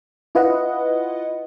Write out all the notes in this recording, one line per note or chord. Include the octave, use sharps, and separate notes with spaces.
E4 F4 B4 D#5 F#5